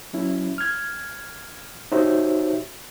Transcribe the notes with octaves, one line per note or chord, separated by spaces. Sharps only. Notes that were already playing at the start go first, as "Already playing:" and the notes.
F#3 C#4 E4
F6 G#6
D#4 F#4 G4 C5 C#5 E5